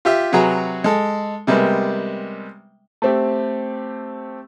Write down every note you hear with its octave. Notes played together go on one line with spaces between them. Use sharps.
F4 G4 E5
C3 F#3 F#4 G#4 B4 A#5
G#3 A4
C3 G3 G#3 A#3 B3
A3 C4 G4